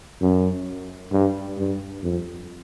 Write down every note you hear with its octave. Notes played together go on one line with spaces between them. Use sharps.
F#2
G2
G2
F2